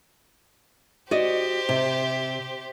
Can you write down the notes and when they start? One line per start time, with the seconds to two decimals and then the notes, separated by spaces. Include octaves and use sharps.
1.11 F#4 G4 C5 D5 D#5
1.69 C3